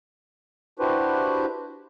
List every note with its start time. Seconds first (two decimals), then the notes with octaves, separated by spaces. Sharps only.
0.79 D4 E4 F#4 G4 B4 C5